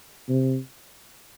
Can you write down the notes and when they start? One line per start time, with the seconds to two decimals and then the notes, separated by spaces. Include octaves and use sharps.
0.29 C3